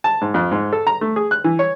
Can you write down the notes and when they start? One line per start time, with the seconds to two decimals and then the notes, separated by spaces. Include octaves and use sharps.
0.04 A5
0.21 G#2
0.34 F2
0.51 G#2
0.73 A4
0.87 A#5
1.01 A3
1.16 G#4
1.31 F#6
1.44 E3
1.59 C#5